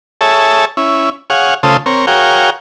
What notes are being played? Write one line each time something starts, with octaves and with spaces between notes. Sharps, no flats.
G#4 A4 C#5 E5 A5
C#4 E4
G#4 C#5 F5 F#5
C#3 A3 F4 A4 C5 D#6
C4 A#4 C#5
F#4 G#4 A#4 C#5 F5 G5